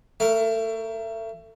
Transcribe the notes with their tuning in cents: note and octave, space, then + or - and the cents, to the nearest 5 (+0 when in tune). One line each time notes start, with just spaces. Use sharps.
A3 +30 A#4 +0